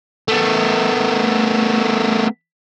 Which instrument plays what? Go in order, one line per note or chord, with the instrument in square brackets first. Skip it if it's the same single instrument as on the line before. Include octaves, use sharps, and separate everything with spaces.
[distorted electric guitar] A3 B3